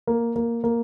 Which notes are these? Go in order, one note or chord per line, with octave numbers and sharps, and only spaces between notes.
A#3
A#3
A#3